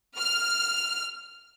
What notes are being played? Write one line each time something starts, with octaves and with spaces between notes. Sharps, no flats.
F6